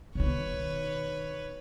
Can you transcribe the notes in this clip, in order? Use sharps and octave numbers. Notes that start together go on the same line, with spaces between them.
B2 D#3 B4 C#5